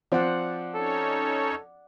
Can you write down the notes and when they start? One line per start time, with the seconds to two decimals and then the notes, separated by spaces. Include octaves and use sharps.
0.12 F3 C4 D5 F#5
0.75 C#4 D#4 A4 C#5